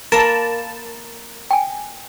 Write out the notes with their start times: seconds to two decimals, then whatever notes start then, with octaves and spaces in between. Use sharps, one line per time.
0.12 A#3 A#4 A5 B5
1.51 G5 G#5